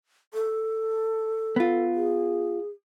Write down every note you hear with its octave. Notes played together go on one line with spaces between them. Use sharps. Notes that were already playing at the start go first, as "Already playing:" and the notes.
A4
B3 F4
G#4